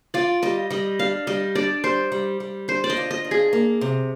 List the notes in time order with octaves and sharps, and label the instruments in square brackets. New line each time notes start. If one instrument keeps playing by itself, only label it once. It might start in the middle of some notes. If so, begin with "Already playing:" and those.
[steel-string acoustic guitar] F4 [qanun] D5
[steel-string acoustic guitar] G3 [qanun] D#5
[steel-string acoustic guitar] G3 [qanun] D#5
[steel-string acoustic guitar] D4 [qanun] F5
[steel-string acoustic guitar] G3 [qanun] D#5
[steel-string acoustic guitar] D4 [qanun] D5
[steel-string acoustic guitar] G3 [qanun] C5
[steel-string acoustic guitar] G3
G3
[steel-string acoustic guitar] D4 [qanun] C5
[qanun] D5
D#5
[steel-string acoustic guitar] F4
[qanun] D#5
[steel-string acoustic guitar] D4
[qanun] G#4
[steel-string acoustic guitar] A#3
C3